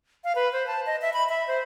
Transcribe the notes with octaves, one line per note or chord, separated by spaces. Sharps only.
F5
B4
C5
A5
D#5
E5
B5
E5
C5